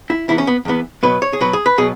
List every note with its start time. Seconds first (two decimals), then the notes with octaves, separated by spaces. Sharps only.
0.10 E4
0.28 E2 E3 B3 E4
0.38 C#4
0.47 B3
0.65 E2 E3 B3
1.03 B2 F#3 B3 B4
1.22 C#5
1.33 G#4
1.41 B2 F#3 B3 B4
1.53 G#4
1.66 B4
1.78 B2 F#3 B3 G#4